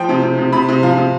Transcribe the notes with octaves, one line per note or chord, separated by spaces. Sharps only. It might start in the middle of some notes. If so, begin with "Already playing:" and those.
Already playing: F3 G5
C3
C3
C3
C3 B5
C3
F3 F5
C3